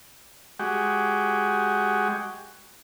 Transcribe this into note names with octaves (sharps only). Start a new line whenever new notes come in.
G#3 F#4 G4